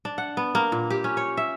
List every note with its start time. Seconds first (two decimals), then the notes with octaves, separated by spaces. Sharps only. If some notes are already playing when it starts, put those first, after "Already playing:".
0.05 D4
0.18 F#5
0.37 B3
0.55 A#3
0.72 A#2
0.90 G4
1.04 C#4
1.17 C#5
1.37 E5